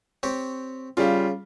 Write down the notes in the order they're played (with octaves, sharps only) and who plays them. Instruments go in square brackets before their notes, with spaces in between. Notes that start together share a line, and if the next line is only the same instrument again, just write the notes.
[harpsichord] C4 G4 C#5
[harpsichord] C#3 [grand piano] G3 F4